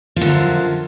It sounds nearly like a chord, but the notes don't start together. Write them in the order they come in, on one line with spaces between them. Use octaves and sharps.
F3 D3 F#2